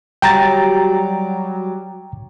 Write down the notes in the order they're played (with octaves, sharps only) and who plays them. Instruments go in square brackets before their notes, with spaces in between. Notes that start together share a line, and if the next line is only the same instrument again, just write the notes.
[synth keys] F#3 G3 D6 [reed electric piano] G5 A#5 A6